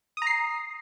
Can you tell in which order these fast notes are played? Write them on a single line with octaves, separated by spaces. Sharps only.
D#6 A#5 C7